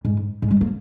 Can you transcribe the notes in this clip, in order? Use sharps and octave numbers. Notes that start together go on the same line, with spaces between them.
G#2
G#2
G#3
A#3